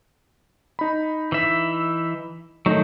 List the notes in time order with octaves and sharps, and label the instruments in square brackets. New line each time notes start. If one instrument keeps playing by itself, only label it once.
[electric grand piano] D#4 B5
[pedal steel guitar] E3 E5
[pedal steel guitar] D#3 F#3 [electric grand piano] A3 D#4